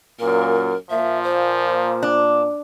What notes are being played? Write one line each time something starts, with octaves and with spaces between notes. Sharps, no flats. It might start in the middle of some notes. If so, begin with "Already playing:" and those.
F#2 A#2 A#4
A#2 F3 E5
C5
D4